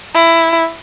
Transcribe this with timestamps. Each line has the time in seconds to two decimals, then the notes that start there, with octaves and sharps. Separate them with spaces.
0.14 E4